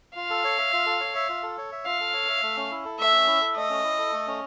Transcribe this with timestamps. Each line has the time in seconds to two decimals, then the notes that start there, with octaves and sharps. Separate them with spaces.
0.16 F4 F5
0.30 A4
0.44 C#5
0.58 E5
0.73 F4
0.86 A4
1.00 C#5
1.15 E5
1.29 F4
1.43 A4
1.58 C#5
1.72 E5
1.86 F4 F5
2.00 A4
2.13 C#5
2.29 E5
2.43 A3
2.57 C#4
2.71 E4
2.85 A4
2.99 A3 E5
3.13 C#4
3.27 E4
3.41 A4
3.55 A3 D#5
3.70 C#4
3.83 E4
3.98 A4
4.13 A3
4.27 C#4